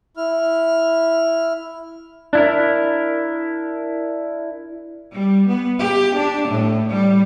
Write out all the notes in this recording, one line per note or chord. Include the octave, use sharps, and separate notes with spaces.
E4 F6
D4 E4 A#4
G3
B3
G4
D4
A2
G3